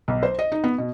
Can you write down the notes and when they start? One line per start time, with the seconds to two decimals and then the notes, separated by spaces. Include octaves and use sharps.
0.08 B1
0.23 C5
0.39 D#5
0.52 D#4
0.64 B3
0.78 B2